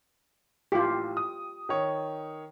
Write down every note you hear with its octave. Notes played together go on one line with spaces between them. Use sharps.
A1 F4 G4
D#6
D#3 C#5